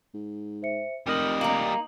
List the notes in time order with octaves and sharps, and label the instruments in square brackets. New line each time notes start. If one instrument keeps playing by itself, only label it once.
[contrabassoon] G#2
[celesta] C5 E5 C#7
[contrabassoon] F1 [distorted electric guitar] G3 D#5 [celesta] A#4 F6 F#7
[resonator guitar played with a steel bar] A#3 D#4 [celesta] F#7